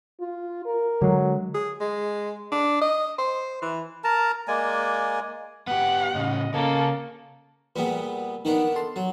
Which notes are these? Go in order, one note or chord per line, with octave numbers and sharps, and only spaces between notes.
F4
A#4
D3 F#3 G#3
G#4
G#3
D4
D#5
C5
E3
A#4 A5 A#5
G#3 A#3 D5 G#5
B3 G4 F#5
A2 C#3 D#5
C#3 A#3 A4
A#2 G3 B3 G#4 B4
D#3 B3 D4 D#4
A4 A5 C6
F#3